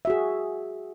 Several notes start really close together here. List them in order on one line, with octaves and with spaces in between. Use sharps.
E5 F#4 G#4